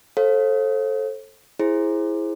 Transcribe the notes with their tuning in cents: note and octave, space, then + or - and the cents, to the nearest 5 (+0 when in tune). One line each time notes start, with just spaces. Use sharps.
A4 +0 C5 +40 F5 +0
E4 +0 G#4 +0 C5 +15